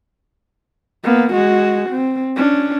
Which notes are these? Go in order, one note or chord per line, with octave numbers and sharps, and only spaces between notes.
A#3 B3
G#3 F#4
C4
C#4 D4